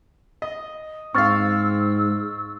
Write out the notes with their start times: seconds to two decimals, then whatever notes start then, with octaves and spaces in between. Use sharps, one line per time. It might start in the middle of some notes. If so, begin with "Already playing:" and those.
0.42 D#5
1.15 G#2 C4 C5 F5 C#6 E6 F6 A6